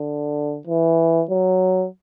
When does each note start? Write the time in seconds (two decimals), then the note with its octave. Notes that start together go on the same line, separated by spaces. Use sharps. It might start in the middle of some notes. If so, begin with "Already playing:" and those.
Already playing: D3
0.67 E3
1.30 F#3